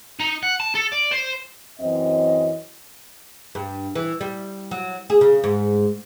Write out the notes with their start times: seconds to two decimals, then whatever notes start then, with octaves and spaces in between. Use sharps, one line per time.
0.20 D#4
0.43 F#5
0.60 A5
0.75 A4
0.93 D5
1.12 C5
1.79 F#2 E3 C4 D#5
3.55 G2
3.95 E3
4.21 G3
4.71 F#3
5.10 G#4
5.21 C#3
5.44 G#2